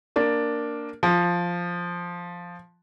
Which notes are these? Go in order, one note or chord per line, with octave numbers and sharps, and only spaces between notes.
A#3 D4
F3